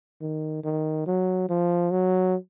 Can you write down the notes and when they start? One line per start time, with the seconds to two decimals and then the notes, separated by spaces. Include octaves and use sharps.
0.21 D#3
0.64 D#3
1.06 F#3
1.49 F3
1.91 F#3